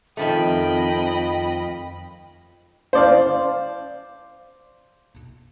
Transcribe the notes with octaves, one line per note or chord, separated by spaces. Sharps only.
F2 D#3 F3 A3 D#5 G5 B5
C5 D5 F5